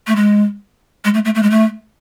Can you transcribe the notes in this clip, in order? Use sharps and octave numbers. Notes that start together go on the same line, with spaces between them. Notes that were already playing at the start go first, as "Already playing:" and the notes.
A3
G#3
G#3
A3
A3
A3
G#3
A3